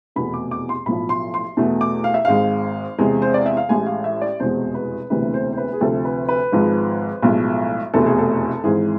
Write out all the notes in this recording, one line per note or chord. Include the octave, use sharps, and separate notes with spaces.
F1 E2 B2 A3 B5
D6
D6
C6
B1 A2 F3 B5
C6
C6
E2 B2 A3
D6
F5
E5
G#1 G#2 G#3 F5
E2 C3 G#3
C5
D5
E5
F5
A1 A2 G#3 G#5
F5
E5
D5
F1 E2 B2 G#3 C5
B4
E1 D2 C3 E3 A3 B4
C5
C5
B4
G#4
D2 C3 F3 A4
B4
B4
G#1 G#2 F3 G#3
B1 A2 F3 G#3
F1 E2 B2 A3 A4
G#4
A4
G#1 G#2 E3 G#3 G#4